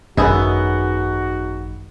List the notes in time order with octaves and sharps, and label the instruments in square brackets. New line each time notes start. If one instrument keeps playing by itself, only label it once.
[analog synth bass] G#1 [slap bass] F#2 [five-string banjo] B3 G#4 E5 [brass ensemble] D#4 F#4